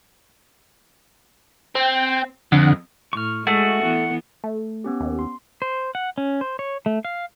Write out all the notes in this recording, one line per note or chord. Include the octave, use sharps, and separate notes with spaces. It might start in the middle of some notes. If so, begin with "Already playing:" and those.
C4 G5
F2 D3 F#5
A2 C#6 F6
G#3 A3 F#4 F#5 G#5 D#6
E3 B3
A3
B3 C#4 G4
D#2
C6
C5
F#5
C#4
C5
C#5
A3
F5